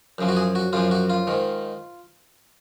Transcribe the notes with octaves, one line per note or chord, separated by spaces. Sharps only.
F#2 C#3 F3
F#4
G#4
F#4
F#2 C#3 F3 F4
F#4
F4
G#2 D#3